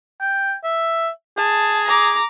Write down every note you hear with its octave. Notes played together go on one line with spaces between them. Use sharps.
G5
E5
G#4 A5
A#5 D6